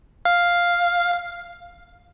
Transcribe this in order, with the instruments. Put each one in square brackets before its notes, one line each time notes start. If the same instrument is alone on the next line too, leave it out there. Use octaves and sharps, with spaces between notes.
[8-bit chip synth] F5